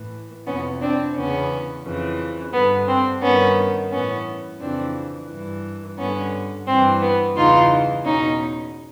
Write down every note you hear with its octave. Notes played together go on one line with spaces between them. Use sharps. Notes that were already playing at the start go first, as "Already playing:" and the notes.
Already playing: A2 E3
F2 C3 E3 B3 C#4
C4 D4
E2 C#3 E3 B3 C#4
F2 C#3 E3
G2 D3 B3
C4
G2 D#3 B3 C#4
A2 E3 B3 C#4
F2 C#3 E3 C4 D4
G2 E3
G2 D3 B3 C#4
G2 E3 C4
B3
E2 C#3 E3 D#4 F4
E2 B2 C#4 D#4